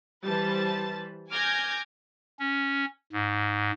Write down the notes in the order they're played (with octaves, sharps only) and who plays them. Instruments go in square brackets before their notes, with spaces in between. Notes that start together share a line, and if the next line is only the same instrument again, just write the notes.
[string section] E3 G3 B4 C5 A5 A6
G#5 D6 F6 G6 G#6 A#6
[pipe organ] C#4
G#2